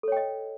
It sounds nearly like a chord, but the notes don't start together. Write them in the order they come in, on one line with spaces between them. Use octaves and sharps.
A4 C#5 G5 D#5